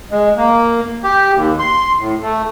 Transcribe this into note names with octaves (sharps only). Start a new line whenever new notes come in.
G#3
A#3
G4
D#2
C6
A2
A3